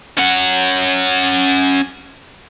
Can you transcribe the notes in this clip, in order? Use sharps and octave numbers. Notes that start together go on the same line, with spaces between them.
C#4 F#5